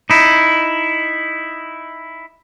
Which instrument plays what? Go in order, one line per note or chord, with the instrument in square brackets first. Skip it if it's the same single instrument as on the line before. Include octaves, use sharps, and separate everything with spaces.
[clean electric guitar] D#4 E4